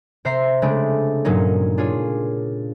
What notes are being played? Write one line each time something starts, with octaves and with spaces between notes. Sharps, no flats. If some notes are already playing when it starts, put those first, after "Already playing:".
C3 C5 E5 A#5 C7
C#3 G#3 A3 C4 D4
G2 A#2 F#3 A#3 C#4 D#4
D4 F4 G#4 C#5